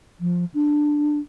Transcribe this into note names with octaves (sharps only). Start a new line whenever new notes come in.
F3
D4